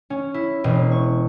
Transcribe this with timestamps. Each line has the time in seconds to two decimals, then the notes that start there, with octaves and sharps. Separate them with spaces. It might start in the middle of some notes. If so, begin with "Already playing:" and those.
0.10 C#4
0.34 E4
0.64 E1
0.91 C#6